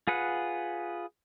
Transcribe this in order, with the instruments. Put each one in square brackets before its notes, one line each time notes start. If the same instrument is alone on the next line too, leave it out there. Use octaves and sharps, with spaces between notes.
[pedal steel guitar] F4 G#4 B4 F#5